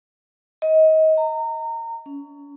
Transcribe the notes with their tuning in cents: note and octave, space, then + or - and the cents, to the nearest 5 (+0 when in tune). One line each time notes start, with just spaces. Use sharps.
D#5 +25
A#5 -25
C#4 +25